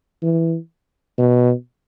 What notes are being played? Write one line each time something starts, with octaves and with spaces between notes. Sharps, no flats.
E3
B2